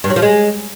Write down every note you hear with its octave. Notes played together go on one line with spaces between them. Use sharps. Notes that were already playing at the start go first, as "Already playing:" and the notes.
G2
F#3
F3
G#3